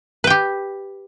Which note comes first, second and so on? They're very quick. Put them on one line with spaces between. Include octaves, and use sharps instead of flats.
B4 G5 G4